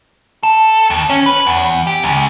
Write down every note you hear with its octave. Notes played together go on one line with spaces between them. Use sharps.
A4
D#2
C#4
B4
E2
G4
C#2